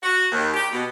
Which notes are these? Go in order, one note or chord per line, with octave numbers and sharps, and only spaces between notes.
F#4
D#2
G4
B2